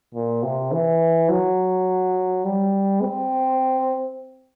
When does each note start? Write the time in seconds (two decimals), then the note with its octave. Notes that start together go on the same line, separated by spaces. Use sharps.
0.14 A#2
0.43 C3
0.72 E3
1.29 F#3
2.44 G3
3.02 C4